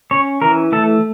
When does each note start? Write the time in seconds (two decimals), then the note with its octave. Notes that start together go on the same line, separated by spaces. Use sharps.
0.11 C#4 C#5
0.42 E3 A#4
0.72 A3 A4